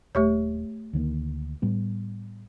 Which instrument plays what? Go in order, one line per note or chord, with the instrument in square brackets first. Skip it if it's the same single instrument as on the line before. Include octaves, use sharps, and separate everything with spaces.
[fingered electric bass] D#1 [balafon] A3 G4 C#5
[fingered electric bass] D2 D#3 A#3
A2 G3 B3